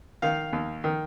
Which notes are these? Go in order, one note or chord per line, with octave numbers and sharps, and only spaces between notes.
D#3 F5
D#2
D#3